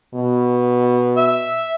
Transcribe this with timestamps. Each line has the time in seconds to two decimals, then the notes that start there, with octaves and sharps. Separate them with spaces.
0.15 B2
1.17 E5